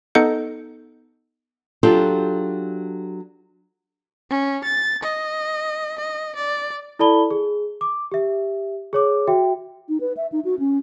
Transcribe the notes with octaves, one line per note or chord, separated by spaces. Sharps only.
B3 D#4 A4 D#5 G6 C#7
F#3 D4 F4 G4 A4
C#4
A6
D#5
D#5
D5
E4 A4 D5 A5 B5 G7
G#4
D6
G4 E5
G#4 C#5 D6
F#4 E5 G5
D#4
B4
E5
D#4
F#4
C#4